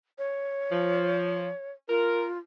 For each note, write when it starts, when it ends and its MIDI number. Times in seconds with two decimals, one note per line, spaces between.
0.19 1.72 73
0.71 1.47 53
1.89 2.38 65
1.89 2.26 70